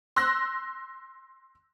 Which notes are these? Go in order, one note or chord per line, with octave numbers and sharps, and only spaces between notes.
C6 E6 F#6 A#6